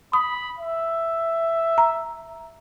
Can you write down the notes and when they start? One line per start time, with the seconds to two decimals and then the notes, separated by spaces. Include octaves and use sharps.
0.13 B5 D#6
0.58 E5
1.78 A#5